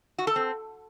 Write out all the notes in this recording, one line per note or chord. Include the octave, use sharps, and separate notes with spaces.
F#4
A4
C4